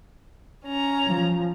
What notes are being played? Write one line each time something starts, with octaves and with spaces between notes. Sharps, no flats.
C#4 A#5
F3